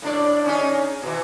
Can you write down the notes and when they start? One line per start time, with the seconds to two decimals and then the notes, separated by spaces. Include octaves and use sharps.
0.02 A2 D4 D5
0.46 C#4 D#4 G#4
1.02 B2 E3